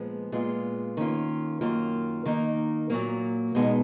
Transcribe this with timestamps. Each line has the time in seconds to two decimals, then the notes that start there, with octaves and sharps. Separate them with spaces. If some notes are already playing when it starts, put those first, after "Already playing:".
Already playing: A#2 F3 G#3 B3
0.32 A#2 G#3 B3 F4
0.97 D#3 A#3 C#4 F4
1.61 F#2 D#3 A#3 F4
2.25 D#3 A#3 D#4
2.90 A#2 F#3 A#3
3.55 B2 G#3 B3 D#4